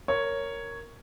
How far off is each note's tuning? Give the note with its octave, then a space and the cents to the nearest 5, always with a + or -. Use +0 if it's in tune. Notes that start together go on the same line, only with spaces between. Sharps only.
A#4 -5 C#5 +0